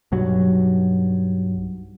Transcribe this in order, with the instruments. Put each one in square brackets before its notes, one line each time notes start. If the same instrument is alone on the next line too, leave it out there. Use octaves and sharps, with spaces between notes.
[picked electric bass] B1 G2 F#3